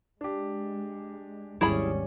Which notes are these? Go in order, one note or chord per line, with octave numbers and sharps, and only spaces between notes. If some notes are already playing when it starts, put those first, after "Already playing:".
G#3 D4 G4
G#1 D#2 G3 C#4 E4 G#4 B5